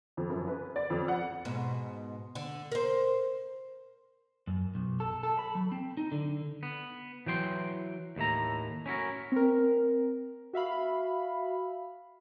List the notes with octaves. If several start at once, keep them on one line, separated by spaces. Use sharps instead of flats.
F2
F#2
B4
D5
F2
F#5
G#2 B2
D3
A#4 C5
F#2
B1
A4
A4
B5
F#3
C4
D#4
D3
B3
E3 F#3 G5 C6
D#2 A2 E4 A#5
C#4 E4 F#4 A#4
C4 A#4
F#4 E5 F5 B5